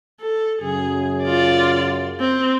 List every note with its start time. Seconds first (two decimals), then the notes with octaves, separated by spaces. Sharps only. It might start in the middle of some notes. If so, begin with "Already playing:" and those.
0.20 A4
0.62 F#2 C#3 F#3 G#4
1.23 F4 D5
2.20 C4